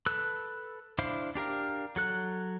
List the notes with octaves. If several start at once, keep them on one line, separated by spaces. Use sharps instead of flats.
A4 B4 E6 F#6
D4 E4 C5 F5
D4 G4 A#4 F5
F#3 A4 F#6